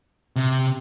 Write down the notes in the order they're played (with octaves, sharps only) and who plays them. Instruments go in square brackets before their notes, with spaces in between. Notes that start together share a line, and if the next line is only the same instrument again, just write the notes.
[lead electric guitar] C3